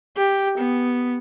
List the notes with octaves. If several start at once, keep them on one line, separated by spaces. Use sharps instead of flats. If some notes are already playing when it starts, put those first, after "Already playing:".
G4
B3